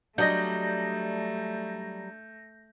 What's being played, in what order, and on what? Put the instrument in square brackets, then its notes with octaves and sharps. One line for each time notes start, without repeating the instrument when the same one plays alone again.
[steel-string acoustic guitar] F#3 G3 [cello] A3 [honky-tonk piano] D4 D#5 [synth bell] G6 A#6